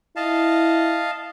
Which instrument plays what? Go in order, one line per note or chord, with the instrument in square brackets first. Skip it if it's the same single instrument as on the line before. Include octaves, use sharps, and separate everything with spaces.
[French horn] E4 [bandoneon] D#5 F5 A5